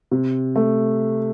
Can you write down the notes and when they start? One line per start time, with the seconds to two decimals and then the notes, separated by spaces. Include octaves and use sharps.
0.11 C3
0.56 A3